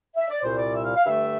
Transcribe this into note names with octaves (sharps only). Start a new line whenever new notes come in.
E5
D5
C2 A#2 G3 C5
D5
E5
F5
F5
G2 D3 A3 E5